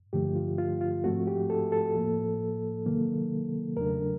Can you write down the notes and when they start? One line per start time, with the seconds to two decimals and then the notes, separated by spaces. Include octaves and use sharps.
0.13 G2 D3 F3 A3 G4
0.35 F4
0.58 F4
0.81 F4
1.04 G#2 F3 A3 C4 F#4
1.27 G4
1.50 A4
1.72 A4
1.95 A2 F3 A#3
2.86 C3 D#3 F#3 A#3
3.77 E2 C#3 F#3 A3 D4 A#4